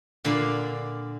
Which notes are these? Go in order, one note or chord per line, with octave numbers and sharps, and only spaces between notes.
A#2 D3 D5 F5 B5